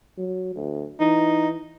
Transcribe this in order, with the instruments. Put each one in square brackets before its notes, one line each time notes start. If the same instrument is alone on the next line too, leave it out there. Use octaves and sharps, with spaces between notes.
[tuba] F#3
D2
[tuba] E3 [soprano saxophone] D#4